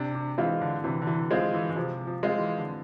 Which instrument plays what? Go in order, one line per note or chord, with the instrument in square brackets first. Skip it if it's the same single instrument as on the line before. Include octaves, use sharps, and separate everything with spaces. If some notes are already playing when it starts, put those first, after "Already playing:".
Already playing: [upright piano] C3 [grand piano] D4
[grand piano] D4
[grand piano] E3 [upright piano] G#3 C4 F4
[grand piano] D3
[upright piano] C3 [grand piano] E3
[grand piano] D3
E3
[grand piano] F3 [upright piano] G#3 C4 F4
[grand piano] E3
G#3
[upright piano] C3 [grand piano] F3
[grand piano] F3
[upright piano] G#3 C4 F4
[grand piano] E3
D3